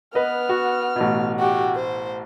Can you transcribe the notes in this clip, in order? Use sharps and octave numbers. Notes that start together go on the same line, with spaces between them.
B3 B4 D#5 F6
F#4
A1 B2
F#4 G4
C5